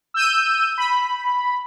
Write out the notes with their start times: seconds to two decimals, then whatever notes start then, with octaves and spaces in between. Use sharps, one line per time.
0.14 E6 G6 D#7
0.78 B5